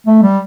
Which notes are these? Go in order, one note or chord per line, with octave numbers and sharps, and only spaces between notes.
A3
G3